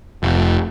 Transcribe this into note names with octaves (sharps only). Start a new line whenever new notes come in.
F1